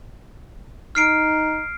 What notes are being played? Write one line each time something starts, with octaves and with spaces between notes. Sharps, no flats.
D#4 F6 C7 D7